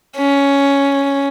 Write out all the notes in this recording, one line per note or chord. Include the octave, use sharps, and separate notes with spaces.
C#4